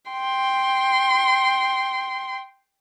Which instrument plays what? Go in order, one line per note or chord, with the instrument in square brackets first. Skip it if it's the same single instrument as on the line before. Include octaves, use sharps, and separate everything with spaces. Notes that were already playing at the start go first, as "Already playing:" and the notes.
[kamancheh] G5 C6